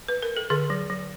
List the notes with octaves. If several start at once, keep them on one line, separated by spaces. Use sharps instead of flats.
B4
A#4
A4
D3 G#4
F#3
F#3